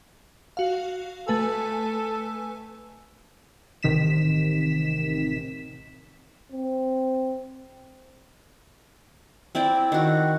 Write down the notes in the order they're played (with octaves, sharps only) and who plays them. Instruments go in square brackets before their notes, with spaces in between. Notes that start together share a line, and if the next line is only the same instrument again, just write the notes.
[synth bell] F#4 F5
[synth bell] A3 B4 G#5 [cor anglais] A4
[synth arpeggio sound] A1 C3 D#3 B6 E7
[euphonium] C4
[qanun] C4 E4 D5 G5
D#3 F#4